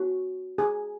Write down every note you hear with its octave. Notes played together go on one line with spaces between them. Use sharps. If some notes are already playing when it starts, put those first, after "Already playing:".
Already playing: F#4
G#4